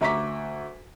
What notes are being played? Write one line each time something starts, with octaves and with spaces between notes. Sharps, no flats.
D2 E5 A#5 C#6 D6 B6